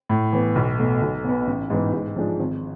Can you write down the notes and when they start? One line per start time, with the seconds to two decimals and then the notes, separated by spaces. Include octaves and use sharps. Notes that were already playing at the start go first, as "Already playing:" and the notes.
0.09 A2
0.33 E3 B3
0.55 B1
0.78 B2 A3
1.02 B1
1.24 B2 B3
1.47 A1
1.70 G#2 E3 B3
1.93 G#2
2.16 F3 G#3 D4
2.40 G#1